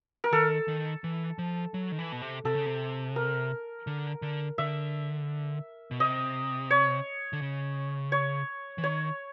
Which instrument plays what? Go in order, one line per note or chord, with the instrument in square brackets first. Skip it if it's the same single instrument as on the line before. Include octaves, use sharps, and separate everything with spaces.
[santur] A#4
[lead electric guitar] D#3 [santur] A4
[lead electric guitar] D#3
E3
F3
F#3
D#3
E3
B2
C3
[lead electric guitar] C3 [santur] A4
[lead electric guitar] C#3
C3
[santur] A#4
[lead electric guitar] D3
D3
[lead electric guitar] D3 [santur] E5
[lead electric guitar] B2
[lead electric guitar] C3 [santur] D#5
[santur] C#5
[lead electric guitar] D3
C#3
[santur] C#5
[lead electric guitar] E3
[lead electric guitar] D#3 [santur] C#5